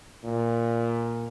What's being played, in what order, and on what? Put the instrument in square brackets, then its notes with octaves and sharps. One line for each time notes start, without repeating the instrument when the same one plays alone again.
[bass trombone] A#2